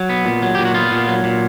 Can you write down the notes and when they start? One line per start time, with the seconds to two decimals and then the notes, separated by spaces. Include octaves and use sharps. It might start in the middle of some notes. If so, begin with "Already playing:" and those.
Already playing: F#3
0.09 B3
0.25 A#2
0.42 F#3
0.55 A#2 G4
0.65 F#4
0.74 B3 F4
0.91 A#2
1.08 F#3
1.24 A#2